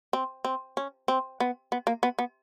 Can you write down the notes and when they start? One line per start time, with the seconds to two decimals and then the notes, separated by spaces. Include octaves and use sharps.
0.13 C4
0.45 C4
0.77 C#4
1.08 C4
1.40 B3
1.72 B3
1.87 A#3
2.03 B3
2.19 B3